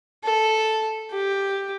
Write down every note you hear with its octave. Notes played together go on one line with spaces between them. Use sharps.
A4
G4